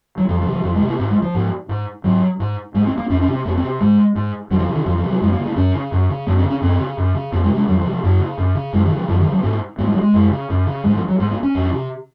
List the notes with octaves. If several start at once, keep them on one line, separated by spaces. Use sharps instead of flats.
F#3
F2 F3
F3
C3
F3
F2 F3
G#3
C3
A#3
G#2 C4
G#3
F3
G#2
G#2
G#2 F#3
G#2
G#2 G#3
C4
A#3
F2 C#4
C#4
C3
C4
F2 A#3
C4
C3
G#2 G#3
G#2
F2 F#3
D#3
F3
C3
D#3
F2 F3
F3
C3
F#3
F#2 G#3
A#3
C#3
A#3
F#2 C#4
C#3
F#2
C#3
F#2 A#3
C4
C#3
C#4
F#2 C4
C#3
F#2
C#3
F2 A#3
G#3
C3
G#3
F2 F#3
F3
C3
F3
F#2 A#3
C#3
F#2
C#3
F#2 G#3
D#3
C#3
F3
F#2 F3
D#3
C#3
F#3
G#2 A#3
G#2 A#3
G#3
F#3
G#3
F#2
C#3
F#2
C#3
G#2 G#3
F3
F#3
G#2 G#3
A#3
C#4
F2
C3